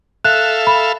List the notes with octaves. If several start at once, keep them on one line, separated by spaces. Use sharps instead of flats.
A4 E5 F5 F#6
B5